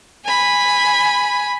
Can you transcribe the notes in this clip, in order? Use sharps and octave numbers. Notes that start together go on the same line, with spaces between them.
G#5 B5